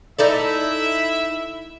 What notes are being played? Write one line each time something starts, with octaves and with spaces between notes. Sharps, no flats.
D#4 E4 A4 D5 E5